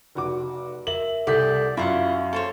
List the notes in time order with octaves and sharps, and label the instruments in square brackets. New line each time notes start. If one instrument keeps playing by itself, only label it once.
[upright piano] F1 F#4 D6
[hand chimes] A#4 E5 [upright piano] F#7
[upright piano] C2 B6 [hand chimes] A4 F#5 G6 [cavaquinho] D5
[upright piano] F#2 [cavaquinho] E4 F4 F#5 [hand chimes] F5 C#6
[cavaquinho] A4 C5 C#5